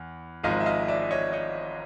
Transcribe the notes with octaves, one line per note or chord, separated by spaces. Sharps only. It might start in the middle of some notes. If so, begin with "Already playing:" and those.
Already playing: E2
G#1 G#2 F3 G#3 D#5 F5
E5
D#5 F5
D5 E5
C#5 D#5
C#5 D#5